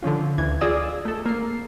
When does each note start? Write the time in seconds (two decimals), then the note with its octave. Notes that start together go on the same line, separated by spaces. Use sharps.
0.03 D3 F3 C#4 F4
0.38 D2 E3 G#6
0.61 F4 G#4 D5 D#5 D#6 E6
1.05 A3 A4
1.26 A#3 C7